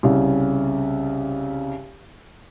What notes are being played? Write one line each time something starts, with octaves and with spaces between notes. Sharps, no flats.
C2 C#3